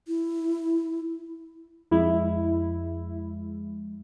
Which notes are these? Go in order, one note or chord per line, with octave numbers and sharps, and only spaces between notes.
E4
F2 G#3 E4